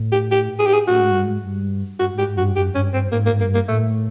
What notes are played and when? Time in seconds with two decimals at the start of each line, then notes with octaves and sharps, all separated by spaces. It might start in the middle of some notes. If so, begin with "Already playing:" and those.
Already playing: A2
0.12 G4
0.31 G4
0.59 G#4
0.66 G4
0.74 G#4
0.87 A2 F#4
1.00 G#2
1.11 G2
1.24 G#2
1.44 G2
2.00 G2 F#4
2.14 G#2 G4
2.28 G#2
2.36 F#2 F#4
2.42 G2
2.56 F#2 G4
2.75 G2 C#4
2.94 G2 C4
3.12 G#2 A#3
3.26 A#3
3.33 G#2
3.40 G2 A#3
3.54 A#3
3.68 A2 A3